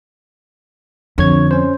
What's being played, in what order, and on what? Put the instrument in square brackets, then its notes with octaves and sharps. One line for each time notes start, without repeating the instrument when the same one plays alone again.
[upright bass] F2 [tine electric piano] D3 C#5 G#6
[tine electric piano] C#4 C5